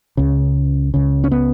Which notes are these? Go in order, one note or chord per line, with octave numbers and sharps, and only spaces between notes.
C#2 C#3
C#2 C#3
C#4
B3